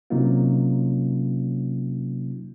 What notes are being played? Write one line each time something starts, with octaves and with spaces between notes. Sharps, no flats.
C3 F#3 A#3 C#4 D#4 F4